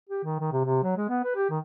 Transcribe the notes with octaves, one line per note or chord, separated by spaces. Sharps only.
G4
D#3
D#3
C3
C3
F#3
G#3
B3
B4
G4
D#3